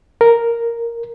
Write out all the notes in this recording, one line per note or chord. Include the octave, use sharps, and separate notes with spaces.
A#4